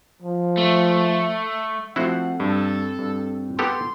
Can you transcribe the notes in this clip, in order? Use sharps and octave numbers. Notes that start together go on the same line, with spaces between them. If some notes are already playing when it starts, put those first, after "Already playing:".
F3
A3
F3 A3 C4 E4 F#4 C5 F#5 C7
G2 A4
G2
B3 G4 A4 C6